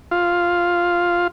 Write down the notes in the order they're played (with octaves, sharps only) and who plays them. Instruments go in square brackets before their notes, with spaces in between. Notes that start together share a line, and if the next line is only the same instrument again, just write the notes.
[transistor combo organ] F4